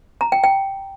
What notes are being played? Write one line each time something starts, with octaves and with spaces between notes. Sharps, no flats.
A#5
G5
G5